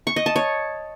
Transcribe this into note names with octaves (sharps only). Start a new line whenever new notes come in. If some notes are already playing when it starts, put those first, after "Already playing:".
C#6
D#5
A5
C#5